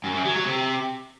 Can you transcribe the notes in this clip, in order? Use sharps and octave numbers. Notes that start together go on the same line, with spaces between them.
F#2
F#2
F#3
F#3
C3